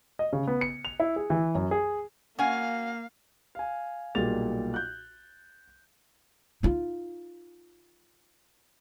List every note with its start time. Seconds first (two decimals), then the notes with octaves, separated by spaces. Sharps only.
0.19 D#5
0.33 C#3
0.47 B3
0.61 C#7
0.85 F7
1.00 E4
1.16 G#4
1.30 E3
1.55 F#2
1.71 G#4
2.39 A#3 C#4 F#4 F5 G#5
3.55 F5 G#5
4.15 B1 A#2 G3 G#4 A6 F7
4.74 F#6 G6
6.63 D#4 F4